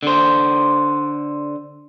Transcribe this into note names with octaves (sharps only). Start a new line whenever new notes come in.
D3 C5